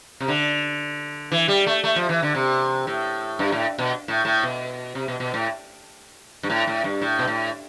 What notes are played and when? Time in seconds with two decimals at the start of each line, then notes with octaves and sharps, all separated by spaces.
0.20 C3
0.28 D3
1.32 E3
1.48 G3
1.66 A3
1.84 A3
1.96 F3
2.09 E3
2.23 D3
2.35 C3
2.87 A2
3.39 G2
3.52 A2
3.79 B2
4.08 A2
4.25 A2
4.43 B2
4.95 C3
5.08 B2
5.20 B2
5.34 A2
6.43 G2
6.50 A2
6.67 A2
6.84 G2
7.02 A2
7.19 B2
7.28 A2